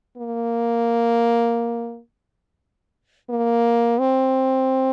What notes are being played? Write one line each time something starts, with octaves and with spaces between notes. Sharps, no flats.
A#3
A#3
C4